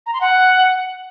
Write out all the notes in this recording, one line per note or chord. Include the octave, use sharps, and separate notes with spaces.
A#5
C6
F#5